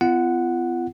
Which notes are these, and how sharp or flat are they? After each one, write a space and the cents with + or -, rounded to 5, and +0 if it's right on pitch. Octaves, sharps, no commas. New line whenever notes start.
B3 +40 F4 -35 F#5 +0